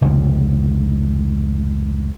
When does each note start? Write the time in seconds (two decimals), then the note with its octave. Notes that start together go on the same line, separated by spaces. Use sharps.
0.01 F1 C#2 F3